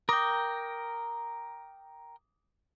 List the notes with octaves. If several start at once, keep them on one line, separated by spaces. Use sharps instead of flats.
A#4 G5 D6 D#6 A#6